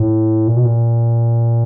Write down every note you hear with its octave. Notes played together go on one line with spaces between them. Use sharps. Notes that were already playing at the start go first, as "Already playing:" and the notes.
Already playing: A2
A#2
B2
A#2